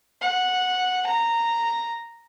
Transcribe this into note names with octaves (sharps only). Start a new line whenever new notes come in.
F#5
A#5